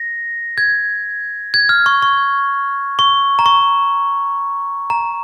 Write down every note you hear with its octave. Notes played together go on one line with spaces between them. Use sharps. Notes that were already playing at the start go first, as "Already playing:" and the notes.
Already playing: A#6
G#6
G#6
F6
C#6
C#6
C#6
A#5
C#6
A#5